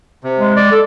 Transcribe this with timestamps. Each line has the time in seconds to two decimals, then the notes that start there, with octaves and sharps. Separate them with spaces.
0.24 C3
0.39 G#3
0.57 D5
0.72 A4